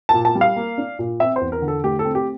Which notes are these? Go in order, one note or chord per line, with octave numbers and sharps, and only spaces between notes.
A5
A#2
A5
G3
F5
A#3
D4
A#2
C4 E5
C5
E2
A#4
D3
A4
A3 G4
A4
C4
G4